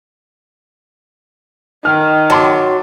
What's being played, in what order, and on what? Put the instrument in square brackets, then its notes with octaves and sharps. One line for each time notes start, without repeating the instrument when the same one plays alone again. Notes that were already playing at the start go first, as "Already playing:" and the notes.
[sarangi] D#3 [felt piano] F6
[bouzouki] F#3 [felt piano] A5 C6 D6